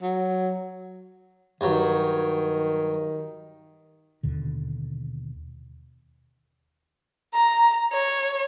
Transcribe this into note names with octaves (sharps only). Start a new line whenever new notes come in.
F#3
G2 D#3 F#3
D#2 B2 D3
A#5
C#5